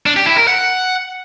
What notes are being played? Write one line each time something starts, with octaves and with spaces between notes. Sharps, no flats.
D4
G4
E4
A#4
F#5